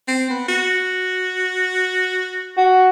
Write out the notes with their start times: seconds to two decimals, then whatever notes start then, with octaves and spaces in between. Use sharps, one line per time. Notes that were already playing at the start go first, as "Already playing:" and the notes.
0.08 C4
0.30 B3
0.48 F#4
2.57 F#4